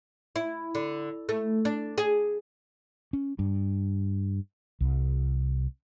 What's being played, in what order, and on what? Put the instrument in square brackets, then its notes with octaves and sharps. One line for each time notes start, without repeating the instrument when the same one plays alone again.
[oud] E4
D3
A3
D4
G#4
[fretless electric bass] C#4
G2
C2